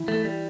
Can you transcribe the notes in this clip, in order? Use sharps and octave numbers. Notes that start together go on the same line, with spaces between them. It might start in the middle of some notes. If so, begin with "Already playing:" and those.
Already playing: E3 E4
A3
G3